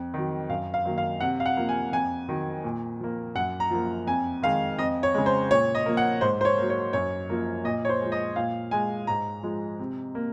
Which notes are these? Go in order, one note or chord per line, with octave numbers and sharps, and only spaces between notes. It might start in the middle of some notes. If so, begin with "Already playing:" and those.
Already playing: F2
D#3 F#3
F#2 F5
F5
D#3 F#3 A#3
F5
C3 F#5
F5
F#5
F3 A#3
G#5
F2 G#5
D#3 F#3
A#2
F3 A#3
F#2 F#5
A#5
F3 A#3
F2 G#5
D#3 G#3 F5
F2 D#5
C#5
C#3 G#3
C5
A#2 C#5
D#5
F3 A#3
F#5
G#2 C5
C5
C#5
F#3 A#3
C#5
F#2 C#5
F3 A#3
A#2 D#5
C#5
C5
F3 G#3
D#5
A#2 F5
G#3 G#5
G#2 A#5
F3 G#3
C3
A#3